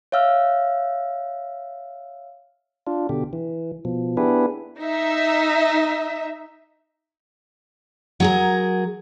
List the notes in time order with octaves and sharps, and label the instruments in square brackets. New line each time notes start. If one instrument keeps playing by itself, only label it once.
[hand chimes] C#5 E5 F5 E6 F6
[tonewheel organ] D4 F4
B2 D3 G4
E3
B2 F3
B3 D4 E4 G4 G#4 B4
[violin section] D#4 E5
[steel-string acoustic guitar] F#3 G#4 A#4